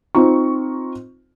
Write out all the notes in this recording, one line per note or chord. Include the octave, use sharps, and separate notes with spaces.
C4 D#4 F4 C#6